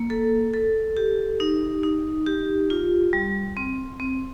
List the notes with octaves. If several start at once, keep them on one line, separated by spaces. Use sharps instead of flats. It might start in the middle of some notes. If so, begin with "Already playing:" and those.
Already playing: A#3
A4
A4
G4
D#4
D#4
G4
F4
G3
C4
C4